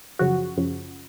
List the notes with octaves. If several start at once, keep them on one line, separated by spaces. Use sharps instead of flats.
F#2 C#3 F3 F#4
F#2 C#3 F3